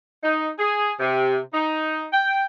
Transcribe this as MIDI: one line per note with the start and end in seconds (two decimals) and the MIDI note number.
0.23 0.49 63
0.58 0.92 68
1.00 1.39 48
1.53 2.05 63
2.12 2.45 79